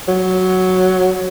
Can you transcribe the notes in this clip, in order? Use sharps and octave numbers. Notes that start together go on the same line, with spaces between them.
F#3